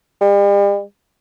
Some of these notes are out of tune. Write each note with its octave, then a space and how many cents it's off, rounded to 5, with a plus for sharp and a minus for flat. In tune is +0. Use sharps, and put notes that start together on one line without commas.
G3 +40